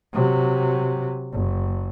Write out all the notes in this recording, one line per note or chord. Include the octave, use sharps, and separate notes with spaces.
C3 F#3
F#1